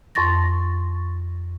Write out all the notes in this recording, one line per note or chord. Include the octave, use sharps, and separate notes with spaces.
F2 C6 C#6 A6 A#6